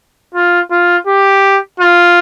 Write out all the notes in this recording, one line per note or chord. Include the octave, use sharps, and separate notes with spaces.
F4
F4
G4
F4